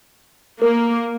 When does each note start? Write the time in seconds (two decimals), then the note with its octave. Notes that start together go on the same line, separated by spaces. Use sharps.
0.62 A#3 A#4